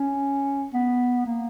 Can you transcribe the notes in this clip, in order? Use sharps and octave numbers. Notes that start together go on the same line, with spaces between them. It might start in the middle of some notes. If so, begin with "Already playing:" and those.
Already playing: C#4
B3
A#3